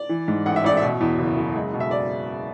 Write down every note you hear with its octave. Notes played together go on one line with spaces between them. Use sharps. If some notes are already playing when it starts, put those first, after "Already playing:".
Already playing: D5
E3
G#2
A1 F#5
E5
A1 D5
B2 E5
E2
F#1
F#1
G#3
B2
E5
D5